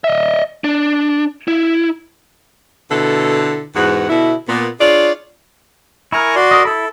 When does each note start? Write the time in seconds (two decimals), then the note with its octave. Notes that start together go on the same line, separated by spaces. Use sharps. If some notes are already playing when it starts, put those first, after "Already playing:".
0.04 D#5 E5
0.64 D4
1.48 E4
2.91 B2 D3 E4 A4
3.76 E2 G#2 G#3 F#4 B4 F#5
4.10 B2 D3 E4
4.49 A#2 B3
4.81 D4 F4 G#4 C#5 D5
6.12 E4 A#4 G#5 A#5 C#6
6.36 F#4 D5 C6
6.51 A#4 D#5
6.65 E4 A4 B5